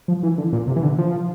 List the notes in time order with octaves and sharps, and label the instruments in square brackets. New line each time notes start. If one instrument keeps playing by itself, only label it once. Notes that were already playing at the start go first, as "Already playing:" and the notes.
[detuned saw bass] F3
E3
D3
A#2
C3
E3
D3
F3